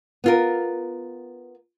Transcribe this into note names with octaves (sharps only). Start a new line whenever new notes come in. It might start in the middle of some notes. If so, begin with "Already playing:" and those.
B3 F4 A#4